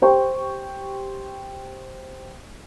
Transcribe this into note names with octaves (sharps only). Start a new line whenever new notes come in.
G4 C5 G5 C#6